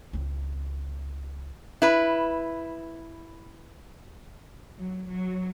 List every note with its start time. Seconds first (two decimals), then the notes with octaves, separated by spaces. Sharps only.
0.13 C#2 C4
1.82 E4 B4
4.78 F#3
5.09 F#3